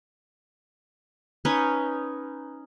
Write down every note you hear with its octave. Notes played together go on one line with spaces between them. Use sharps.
C#4 D#4 B4 C#5